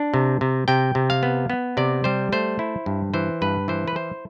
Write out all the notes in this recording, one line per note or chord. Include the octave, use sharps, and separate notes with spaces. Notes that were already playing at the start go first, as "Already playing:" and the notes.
Already playing: D4
C3
C3
C3 G5
C3
F5
B3
B3
C3 D5
G3 C5
A3 C5
E4
G2
E3 C5
G2 B4
E3 C5
B4
E4 C5